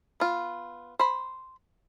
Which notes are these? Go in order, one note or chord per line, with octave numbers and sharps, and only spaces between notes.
B3 F4
C5 B5